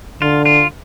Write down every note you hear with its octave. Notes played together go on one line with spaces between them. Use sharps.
D3 F4
F4